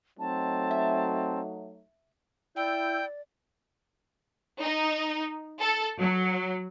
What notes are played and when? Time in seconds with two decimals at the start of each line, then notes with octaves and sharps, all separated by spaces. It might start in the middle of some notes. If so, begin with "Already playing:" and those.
0.19 F#3 A3 C4 D#4 A5
0.71 E5
2.56 E4 D5 G5 B5 E6 G6
4.61 D#4
5.61 A4
5.98 F#3